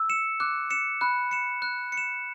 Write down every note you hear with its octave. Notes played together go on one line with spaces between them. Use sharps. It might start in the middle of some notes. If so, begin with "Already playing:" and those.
Already playing: E6
C#7 E7
D6 F#6
C#7 E7
B5 F#6
C#7 E7
F#6
C#7
E7